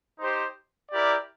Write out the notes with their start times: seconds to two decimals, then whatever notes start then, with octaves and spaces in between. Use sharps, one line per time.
0.19 D#4 G4 C5
0.91 E4 G4 A#4 D5